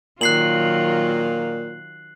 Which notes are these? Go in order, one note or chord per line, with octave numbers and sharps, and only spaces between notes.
A#2 D#3 F#3 F4 F#6 C7 F#7